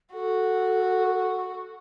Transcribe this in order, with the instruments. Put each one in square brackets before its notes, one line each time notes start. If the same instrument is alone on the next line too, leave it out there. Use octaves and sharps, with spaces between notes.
[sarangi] F#4 [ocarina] A4